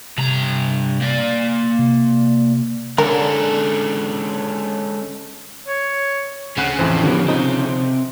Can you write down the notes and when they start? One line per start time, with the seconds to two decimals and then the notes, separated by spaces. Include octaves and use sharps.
0.18 G2 C3 A#5
1.01 A#3 D5
1.79 C3
2.98 D3 G#3 C#4 A4 A#4
5.68 C#5
6.57 D2 C#3 C#4 F#5 B5 F#6
6.79 A1 F2 E3 E4 C5
7.04 A2 D3 F3 B3 G4 A#4
7.28 C3 F3 C4 D#4